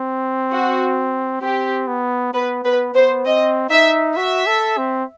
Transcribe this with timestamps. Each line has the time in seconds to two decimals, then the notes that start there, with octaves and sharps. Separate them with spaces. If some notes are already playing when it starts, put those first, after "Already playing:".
Already playing: C4
0.51 F#4
1.41 C4 G4
1.87 B3
2.34 B3 B4
2.64 B3 B4
2.94 B3 C5
3.25 C4 D#5
3.70 D#4 E5
4.16 F#4 E5
4.47 A4
4.78 C4